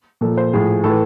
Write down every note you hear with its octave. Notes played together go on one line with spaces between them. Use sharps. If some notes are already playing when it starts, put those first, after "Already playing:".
A#2 F3 A4
C5
A2 F3 G#4
A2 A4
E3